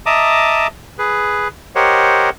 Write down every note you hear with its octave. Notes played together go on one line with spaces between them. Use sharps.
D#5 E5 A5 A#5 D6 D#6
G#4 B4
G4 A#4 C5 C#5 D#5 F#5